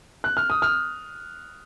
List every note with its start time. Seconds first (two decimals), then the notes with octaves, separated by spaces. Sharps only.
0.24 F#6
0.37 F6
0.50 D#6
0.62 F6